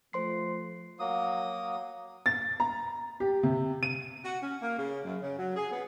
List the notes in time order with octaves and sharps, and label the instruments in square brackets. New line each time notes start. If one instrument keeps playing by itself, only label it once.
[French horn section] F3 A3 [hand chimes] C5 C6 C7
[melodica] F#3 A#3 D#6
[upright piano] A6
A#5
G4
C3
D#7
[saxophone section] F#4
C#4
A#3
C#3
F#2
C#3
F#3
G#4
B3